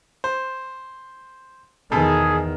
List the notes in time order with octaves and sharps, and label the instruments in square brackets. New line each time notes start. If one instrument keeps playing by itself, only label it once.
[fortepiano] C5
[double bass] E2 D#3 [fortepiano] B2 A4 [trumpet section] G#4